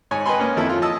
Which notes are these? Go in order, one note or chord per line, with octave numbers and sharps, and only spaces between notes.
G#2 C#5 G#5
B4 D#5 G5 G#5 B5 C6
A#3 C#4 D#5
F2 E4 A4 E5
F4
D#5 A5 D#6 E6